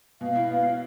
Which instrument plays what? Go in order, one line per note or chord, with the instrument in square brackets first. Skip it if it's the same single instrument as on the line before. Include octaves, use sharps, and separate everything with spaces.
[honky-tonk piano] B2 [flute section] F5
[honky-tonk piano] E4
B3
E4